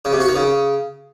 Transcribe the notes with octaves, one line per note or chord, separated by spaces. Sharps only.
C#3
C3
F#4
D#3
C#3